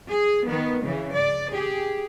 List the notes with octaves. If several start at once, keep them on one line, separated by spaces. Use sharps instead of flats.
G#4
D#3 B3
C#3 E3
D5
G4 G#4